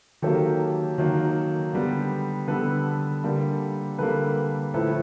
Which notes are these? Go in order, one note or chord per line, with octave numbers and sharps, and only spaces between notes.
D#3 F#3 A#3 G4 A4
D#3 F#3 A#3
D3 G3 B3
D3 G3 B3 A4 B4
D3 G3 A#3
D3 G3 A#3 A4 B4
A2 F3 A3 A4 B4